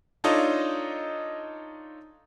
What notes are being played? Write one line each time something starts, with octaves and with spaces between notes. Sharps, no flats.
D4 D#4 F4 A4 C#5 D#5